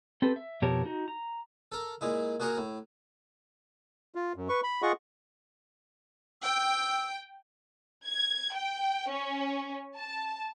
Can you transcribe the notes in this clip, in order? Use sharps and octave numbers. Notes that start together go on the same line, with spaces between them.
C4 G4 A4 B4
E5
F2 B2 G4 A#4 C#5 A5
D#4 F#4
A#5
A4 A#4
A#2 G#3 E4
A#2 F#4 G#4 A#4 F#5
A2
F4
F#2
B4 C#6
B5
F4 G#4 D#5 F#5 C#6
G5 E6
G#6
G5
C#4
A5